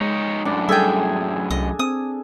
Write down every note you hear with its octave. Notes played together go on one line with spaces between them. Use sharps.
G#3 D#4 C#5
F#2 A2 D4
G3 G#4 A4 E5 G5 G#5
C2 D#5
C4 D#6